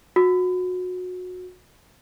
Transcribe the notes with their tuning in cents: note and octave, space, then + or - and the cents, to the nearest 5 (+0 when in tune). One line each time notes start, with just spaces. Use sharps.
F#4 -25